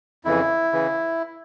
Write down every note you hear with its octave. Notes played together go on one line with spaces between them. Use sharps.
F2 C#3 E3 E4
C#3 E3